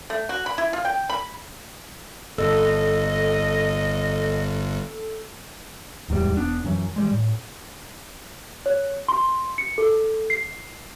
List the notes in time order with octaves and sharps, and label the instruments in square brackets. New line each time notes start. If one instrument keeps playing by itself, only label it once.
[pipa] A3
F#4
B5
E4
F4
G5
B5
[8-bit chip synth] G1 [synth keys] A4 [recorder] D#5
[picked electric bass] D1 E2 G#2 G3
E1 B3 D4
F#2 E3 F#3
E3 G3 G#3
A2
[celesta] C#5
C6
C#7
A4
C7